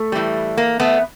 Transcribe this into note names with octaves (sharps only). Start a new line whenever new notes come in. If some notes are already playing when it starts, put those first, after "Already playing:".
Already playing: A3
A2 E3 G3
A#3
A3 B3